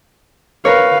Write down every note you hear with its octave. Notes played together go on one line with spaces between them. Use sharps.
A#4 B4 C#5 F5